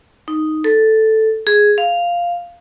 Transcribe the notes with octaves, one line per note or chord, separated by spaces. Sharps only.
D#4
A4
G#4
F5